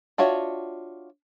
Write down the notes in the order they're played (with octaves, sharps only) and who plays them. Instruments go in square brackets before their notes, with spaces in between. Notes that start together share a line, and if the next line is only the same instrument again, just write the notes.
[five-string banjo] D4 F4 F#4 C#5 E5